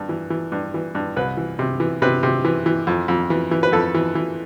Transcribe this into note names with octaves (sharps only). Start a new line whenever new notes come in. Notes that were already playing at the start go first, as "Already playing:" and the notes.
Already playing: G2
E3
E3
G2
E3
G2
C2 B4
E3
C3
E3
C3 B4
C3
E3
E3
F2
F2
E3
E3
B4
F2 A4
E3
E3